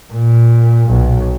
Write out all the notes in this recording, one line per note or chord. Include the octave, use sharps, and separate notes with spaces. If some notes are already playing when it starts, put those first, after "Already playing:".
A#2
B1